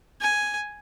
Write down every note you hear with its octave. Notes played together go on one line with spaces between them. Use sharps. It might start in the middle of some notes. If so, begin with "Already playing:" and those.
G#5